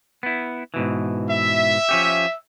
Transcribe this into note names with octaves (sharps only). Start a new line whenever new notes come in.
B3 E4
G#2 B2 E3
E5
F3 C#4 G4